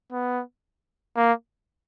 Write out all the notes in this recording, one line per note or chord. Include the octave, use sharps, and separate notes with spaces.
B3
A#3